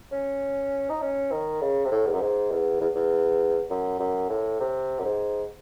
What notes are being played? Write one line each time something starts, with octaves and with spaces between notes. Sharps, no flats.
C#4
D#4
C#4
D#3
C#3
C3
A2
E2
F#2
G#2
E2
E2
E2
F#2
F#2
A2
C3
F#2
G#2